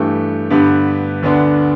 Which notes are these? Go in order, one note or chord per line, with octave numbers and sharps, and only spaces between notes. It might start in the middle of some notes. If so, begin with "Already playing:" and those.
Already playing: G2 E3 A3 G4
G2 D3 B3 G4 B4
D2 D3 B3 D4